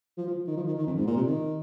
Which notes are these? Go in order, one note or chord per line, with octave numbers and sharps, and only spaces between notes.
F3
F3
D#3
F3
D#3
D#3
F2
G#2
A#2
C3
D#3